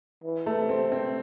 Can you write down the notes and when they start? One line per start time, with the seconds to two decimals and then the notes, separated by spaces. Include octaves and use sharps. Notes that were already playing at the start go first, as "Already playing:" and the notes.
0.24 E3
0.46 A3
0.58 C3
0.69 C4
0.92 C4